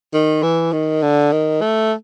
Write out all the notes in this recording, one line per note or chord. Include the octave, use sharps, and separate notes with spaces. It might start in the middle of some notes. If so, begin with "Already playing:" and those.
D#3
E3
D#3
D3
D#3
A3